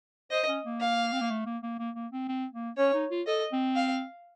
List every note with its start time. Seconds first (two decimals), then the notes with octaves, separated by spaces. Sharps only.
0.31 C5 D#5
0.48 C#4
0.64 A#3
0.81 F5
1.12 C4
1.21 A#3
1.30 A3
1.46 A#3
1.63 A#3
1.79 A#3
1.95 A#3
2.12 C4
2.28 C4
2.53 A#3
2.77 C#4 C#5
2.94 D#4
3.11 F4
3.26 A4 D#5
3.52 C4
3.76 F5